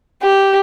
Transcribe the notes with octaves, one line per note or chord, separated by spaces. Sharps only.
G4